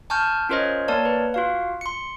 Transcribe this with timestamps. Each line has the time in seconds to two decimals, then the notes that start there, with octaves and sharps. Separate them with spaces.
0.10 G#5 A5 C#6 F6 G6
0.49 C#4 F4 A#4 C5 C#5 D#5
0.88 A#3 A#4 C#5 D5 A5
1.05 B4
1.34 F4 F#4 F5
1.81 C6 C#7